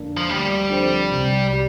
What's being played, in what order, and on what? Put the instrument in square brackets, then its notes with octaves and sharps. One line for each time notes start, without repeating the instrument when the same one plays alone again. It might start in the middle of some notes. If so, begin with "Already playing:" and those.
Already playing: [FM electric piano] F2 D3 A#3 D4
[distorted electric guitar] F3
[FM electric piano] D2 [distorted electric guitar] G3
[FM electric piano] D3 F3 C4
C2
G3